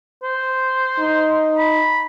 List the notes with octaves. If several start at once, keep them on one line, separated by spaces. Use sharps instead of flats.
C5
D#4
B5